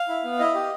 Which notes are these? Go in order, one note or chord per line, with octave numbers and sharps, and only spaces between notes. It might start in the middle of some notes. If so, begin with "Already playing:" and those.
Already playing: F5
E4
B3
E4 D#5
G4